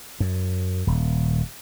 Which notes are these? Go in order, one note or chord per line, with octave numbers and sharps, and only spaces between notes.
F#2
D#1